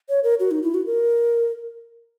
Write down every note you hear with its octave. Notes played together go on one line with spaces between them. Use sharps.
C#5
A#4
F#4
D#4
E4
F#4
A#4